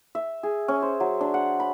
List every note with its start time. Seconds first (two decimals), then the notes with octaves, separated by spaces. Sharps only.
0.15 E5
0.43 G#4
0.68 C#4
0.82 C5
1.00 F#3
1.21 D4
1.34 F#5
1.60 B5